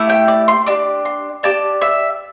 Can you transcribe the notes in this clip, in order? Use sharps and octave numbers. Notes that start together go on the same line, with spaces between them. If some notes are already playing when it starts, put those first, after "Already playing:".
Already playing: A3 E4 G4
G5
D5
C6
D4 G4 D6
C6
D4 G4 A5
E5